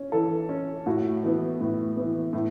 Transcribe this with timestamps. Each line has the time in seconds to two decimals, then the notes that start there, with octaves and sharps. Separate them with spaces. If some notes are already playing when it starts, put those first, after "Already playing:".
Already playing: C#4
0.12 E3 A4
0.49 C#4
0.86 A2 F#4
1.23 E3 B3
1.60 A2
1.97 E3 B3
2.33 A2